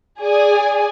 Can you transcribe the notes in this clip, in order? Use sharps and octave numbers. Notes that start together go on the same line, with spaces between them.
G#4 D5 G#5